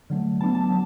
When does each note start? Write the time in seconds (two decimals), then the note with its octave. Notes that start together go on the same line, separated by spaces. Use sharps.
0.10 D3 F#3 A3
0.41 F#3 B3 D4 A5
0.55 A5
0.70 F#3